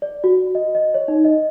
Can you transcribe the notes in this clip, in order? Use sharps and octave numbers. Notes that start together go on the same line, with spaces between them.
D5
F#4
D#5
D#5
C#5
D#4
D#5